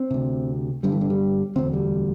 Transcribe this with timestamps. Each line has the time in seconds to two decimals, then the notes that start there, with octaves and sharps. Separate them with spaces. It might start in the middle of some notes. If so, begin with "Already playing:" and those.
Already playing: C4
0.11 D2 C3
0.83 G1 G2 D3 G3
0.92 E3
1.01 D3
1.10 G3
1.56 E1 D2 D3 C4
1.73 G3